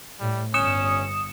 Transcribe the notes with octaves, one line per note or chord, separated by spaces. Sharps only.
A2 G3
G1 C#4 D#6 C#7 E7